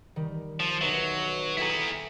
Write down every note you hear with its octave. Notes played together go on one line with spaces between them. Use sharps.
D#3 G3
F3
B1 F#3 B4 E5
E4 G#4 A4 G5 A#5